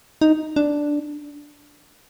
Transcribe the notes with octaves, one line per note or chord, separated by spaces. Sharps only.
D#4
D4